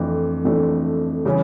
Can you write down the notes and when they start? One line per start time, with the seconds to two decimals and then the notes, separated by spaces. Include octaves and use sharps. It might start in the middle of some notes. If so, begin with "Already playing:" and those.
Already playing: F2 E3 A3 D4
0.44 F2 E3 A3 D4
1.25 C#3 E3 G3 C#4